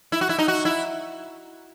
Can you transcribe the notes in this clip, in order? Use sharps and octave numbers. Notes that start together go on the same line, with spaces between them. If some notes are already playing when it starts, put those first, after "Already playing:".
E4
F#4
E4
D#4
F#4
E4